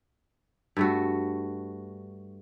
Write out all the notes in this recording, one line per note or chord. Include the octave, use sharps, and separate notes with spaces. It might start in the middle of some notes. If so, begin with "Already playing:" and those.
G2 A3 F#4